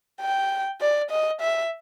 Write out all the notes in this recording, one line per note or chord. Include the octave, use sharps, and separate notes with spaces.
G5
D5
D#5
E5